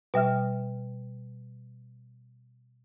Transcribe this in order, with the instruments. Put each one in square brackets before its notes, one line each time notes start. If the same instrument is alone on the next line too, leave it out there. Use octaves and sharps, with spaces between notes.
[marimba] B2 G3 E5 F6